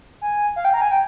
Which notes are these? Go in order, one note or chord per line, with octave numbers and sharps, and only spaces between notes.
G#5
F5
G5
A#5
G#5
G5